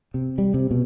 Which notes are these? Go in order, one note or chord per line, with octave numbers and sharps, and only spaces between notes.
C3
G3
C3
B2